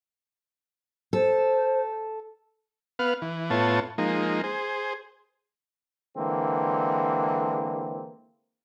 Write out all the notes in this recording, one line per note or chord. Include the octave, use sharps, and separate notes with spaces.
A4 C5
B3 B4 F5 F6
E3
A2 B3 F4 C#5 A5
F3 G#3 A#3 D#4
G#4 C5
D3 E3 G#3 A#3 C4